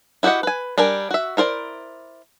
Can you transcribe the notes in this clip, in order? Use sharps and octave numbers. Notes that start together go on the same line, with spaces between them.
E4 F#4 G4 D#5 F#5
B4 G#5
G3 D4 A#4 G#5
F#4 E5
E4 A#4 C5 D5